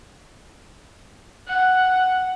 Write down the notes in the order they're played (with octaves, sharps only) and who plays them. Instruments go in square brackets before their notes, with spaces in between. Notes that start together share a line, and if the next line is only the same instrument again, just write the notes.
[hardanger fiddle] F#5 [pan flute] F#6